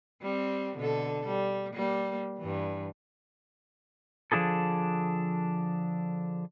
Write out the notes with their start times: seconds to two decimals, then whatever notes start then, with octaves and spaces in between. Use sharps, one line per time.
0.22 G3 C4
0.76 B2 D3 A4
1.26 G3
1.73 G3 A#3
2.38 G2 E3
4.32 D3 F3 D4 E4 G#4 A4